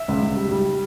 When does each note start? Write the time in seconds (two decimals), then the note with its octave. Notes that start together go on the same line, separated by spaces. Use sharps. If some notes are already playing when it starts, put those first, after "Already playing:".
Already playing: E5
0.08 C#2
0.22 C#2
0.37 G3
0.51 G3